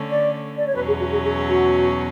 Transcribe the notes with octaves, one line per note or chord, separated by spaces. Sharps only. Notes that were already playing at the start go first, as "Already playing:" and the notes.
Already playing: D3 A3 C#4
D5
D5
C#5
E2 B2 F#3 C#4 B4
G#4
F#4
G#4
G#4
F#4